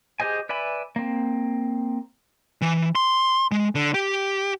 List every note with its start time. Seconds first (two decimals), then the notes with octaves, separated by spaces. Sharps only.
0.20 G4 G#4 C5 D#5 G#5
0.49 B4 D5 E5 G#5 B5
0.96 A#3 C4
2.62 E3
2.95 C6
3.52 G#3
3.75 D3
3.94 G4